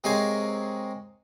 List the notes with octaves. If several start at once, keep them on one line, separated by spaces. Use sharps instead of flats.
C3 G#3 A#4 C#5 F5 G#5